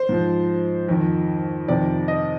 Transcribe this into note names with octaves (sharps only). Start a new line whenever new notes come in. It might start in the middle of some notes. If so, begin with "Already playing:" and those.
Already playing: C5
G#2 F3
F2 D#3
F2 C3 D#3 D5
D#5